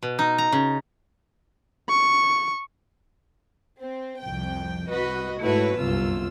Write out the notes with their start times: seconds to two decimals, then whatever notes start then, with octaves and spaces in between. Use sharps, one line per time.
0.03 B2
0.19 D#4
0.38 A#5
0.52 C#3
1.89 C#6
3.79 C4
4.21 C2 F2 G5
4.89 C2 F#4 B4 D#5
5.40 G#2 A3 E4 F#4 B4 C#5
5.77 G1 C2 F#2 F4 E6